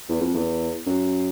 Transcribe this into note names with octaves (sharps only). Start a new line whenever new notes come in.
E2
F2
E2
F#2